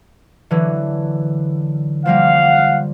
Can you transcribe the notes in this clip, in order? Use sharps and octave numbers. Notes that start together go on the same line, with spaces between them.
D3 E3 F#3
F3 G3 A#3 F5 F#5